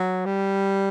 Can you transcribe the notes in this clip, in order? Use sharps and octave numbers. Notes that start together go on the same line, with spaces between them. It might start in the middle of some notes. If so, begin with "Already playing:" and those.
Already playing: F#3
G3